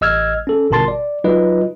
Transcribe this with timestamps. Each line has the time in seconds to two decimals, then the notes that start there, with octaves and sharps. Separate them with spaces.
0.01 A1 D#5 E6 F6 G#6
0.47 C#4 A4
0.71 G1 B2 A#4 A5 C6 A6
0.88 D5
1.24 F#3 D#4 F4 B4 D#5